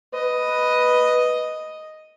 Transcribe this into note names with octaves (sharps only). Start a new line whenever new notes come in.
B4 D#5